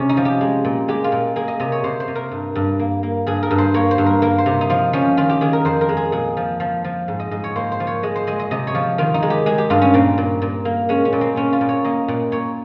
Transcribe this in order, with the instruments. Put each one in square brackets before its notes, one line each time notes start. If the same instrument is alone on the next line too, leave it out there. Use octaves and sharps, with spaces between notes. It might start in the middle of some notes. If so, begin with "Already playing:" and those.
Already playing: [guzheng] C3 C#4
D#4
F3
G4
G#3
A#2
G#3 G4
F4
A#2
A#3 G#4
D#5
C3 D#5
C#5
C3 C5
C5
C3
A#4
G2
G2
A#3
A#3
G2 G#4
A#4
G2
C5
A#3 C#5
C5
G2
A#4
A#3 A#4
C5
C3
D#4
F3 F4
F3 C#4
D#3 F4
G4
D#3 G#4
A#4
F2 C5
A#4
G#3
G#4
A#2 G#4
F3
F3
F3
G#2
D#5
G#2 D#5
C#5
A#3 C5
C5
F3
C#5
G#3 D#5
C5
G#3 D#5
D#5
C3 D#5
C#5
F3
D#3 F4
D#4
G#3
G4
G#3 G#4
G4
G2 F4
C#4
A#2 C4
A#2
A#2
A#3
G#3 C#4
C#4
A#2
C4
A#2 C#4
F4
A#2
C#5
A#3 D#5
A#2
A#2 C#5